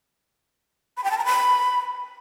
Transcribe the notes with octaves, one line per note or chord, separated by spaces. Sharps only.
B5
G5
A5
A#5
B5